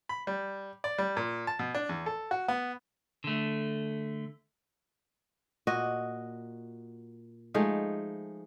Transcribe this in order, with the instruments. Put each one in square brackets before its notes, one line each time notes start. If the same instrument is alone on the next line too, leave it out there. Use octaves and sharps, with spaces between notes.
[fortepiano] B5
G3
D5
G3
A#2
A5
B2
D4
E2
A4
F#4
B3
[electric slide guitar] D3 A3
[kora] A#2 F#4 D#5
F3 G#3 A3 D#4